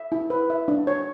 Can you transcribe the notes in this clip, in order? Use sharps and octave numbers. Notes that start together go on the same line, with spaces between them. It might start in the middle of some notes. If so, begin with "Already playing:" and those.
Already playing: E5
E4
B4
E5
D4
C#5